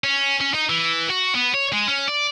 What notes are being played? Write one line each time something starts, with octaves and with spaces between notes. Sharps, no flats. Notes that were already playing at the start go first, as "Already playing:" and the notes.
C#4
C#4
D#4
E3
F#4
B3
C#5
G#3
C#4
D5